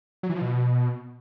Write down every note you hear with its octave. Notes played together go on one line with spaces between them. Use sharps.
F#3
E3
F3
B2